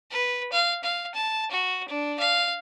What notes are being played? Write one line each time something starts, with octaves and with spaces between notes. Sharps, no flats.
B4
F5
F5
A5
F#4
D4
F5